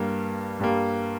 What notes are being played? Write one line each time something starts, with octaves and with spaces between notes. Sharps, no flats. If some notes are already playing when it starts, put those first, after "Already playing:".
Already playing: G2 G3 A#3
G2 G3 A#3